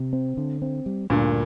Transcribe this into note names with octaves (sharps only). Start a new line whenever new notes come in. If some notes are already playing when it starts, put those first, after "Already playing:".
Already playing: C3
C4
D3
C4
G3
D2 G2 A#2